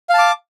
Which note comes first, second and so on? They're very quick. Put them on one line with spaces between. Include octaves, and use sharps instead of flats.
F5 A5 D6